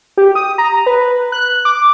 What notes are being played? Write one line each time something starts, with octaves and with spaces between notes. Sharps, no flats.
G4
D#6
A#5
B4
F#6
D6